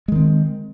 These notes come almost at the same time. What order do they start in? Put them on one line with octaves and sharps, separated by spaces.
G#3 D#3 C4